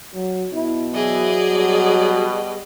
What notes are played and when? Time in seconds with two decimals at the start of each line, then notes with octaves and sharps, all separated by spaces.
0.14 F#3
0.53 B2 E4
0.94 E3 F#3 G#4 D5 D#5
1.47 B2 G3